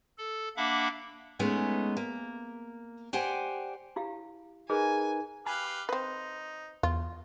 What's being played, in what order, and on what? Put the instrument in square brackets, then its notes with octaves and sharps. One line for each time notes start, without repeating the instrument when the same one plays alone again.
[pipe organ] A4
A#3 D4 E5 F#5 B5 D6
[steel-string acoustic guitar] G#3 A3 B3 C#4 D#4
A#3
G4 C5 D5 F#5 G#5
[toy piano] E4 G4 F5
[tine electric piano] D#4 A#4 B4 [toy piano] G#4 [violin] G#5
[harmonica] G4 B4 F5 [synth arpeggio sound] G#5
[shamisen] C4 B4 [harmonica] D#4
[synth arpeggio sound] E2 [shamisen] F4